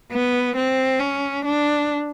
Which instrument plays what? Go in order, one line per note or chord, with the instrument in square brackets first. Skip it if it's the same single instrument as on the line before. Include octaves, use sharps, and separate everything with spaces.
[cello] B3
C4
C#4
D4